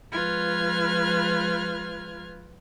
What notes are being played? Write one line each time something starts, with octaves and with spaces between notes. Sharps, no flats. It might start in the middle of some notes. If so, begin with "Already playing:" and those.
F3 G#3 F4 B4 F6 G#6